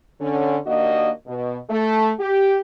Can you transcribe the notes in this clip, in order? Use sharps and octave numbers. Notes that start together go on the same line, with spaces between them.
D3 C#4
D#2 A#3 D4 F#4 D#5
B2
A3
G4